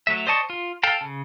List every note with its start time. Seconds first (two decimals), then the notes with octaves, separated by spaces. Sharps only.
0.07 F#3 A3 E5
0.27 C5 D5 D#5 A5 C#6
0.50 F4
0.83 A4 F5 G5 A5
1.01 C#3